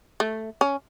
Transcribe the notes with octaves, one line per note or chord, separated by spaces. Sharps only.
A3
C#4